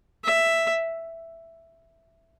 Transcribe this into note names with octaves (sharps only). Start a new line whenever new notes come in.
E5